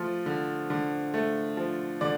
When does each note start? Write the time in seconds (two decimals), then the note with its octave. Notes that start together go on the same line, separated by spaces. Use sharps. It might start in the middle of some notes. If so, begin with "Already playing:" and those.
Already playing: F3 A3
0.26 D3
0.70 D3
1.14 A3
1.57 F3
2.01 D3 D5